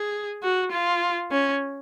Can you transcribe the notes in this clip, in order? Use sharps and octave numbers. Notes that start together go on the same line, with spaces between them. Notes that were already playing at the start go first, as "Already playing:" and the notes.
Already playing: G#4
F#4
F4
C#4